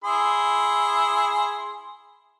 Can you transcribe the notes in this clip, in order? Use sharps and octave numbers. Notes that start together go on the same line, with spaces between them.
E4 G#4 C6